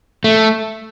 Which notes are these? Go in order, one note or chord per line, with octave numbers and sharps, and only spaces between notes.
A3